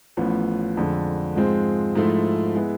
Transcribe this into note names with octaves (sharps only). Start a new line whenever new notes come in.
A1 A2 F3 B3
F2 D3 G#3 D4
G#2 F3 G#3 C4
G#2 F3 A3 E4
G#3 B3 E4